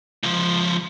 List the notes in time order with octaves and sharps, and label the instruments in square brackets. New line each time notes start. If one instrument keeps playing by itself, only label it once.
[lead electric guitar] C#2 F3